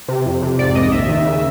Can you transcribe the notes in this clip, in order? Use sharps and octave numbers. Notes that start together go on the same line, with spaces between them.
C3
F2
C3
G#2 D5
A#1 D#5
D#2 E5
D#3
C#3